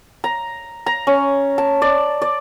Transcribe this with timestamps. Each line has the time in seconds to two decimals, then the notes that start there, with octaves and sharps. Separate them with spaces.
0.24 A#5
0.86 A#5
1.07 C#4
1.58 A5
1.82 D5
2.22 D5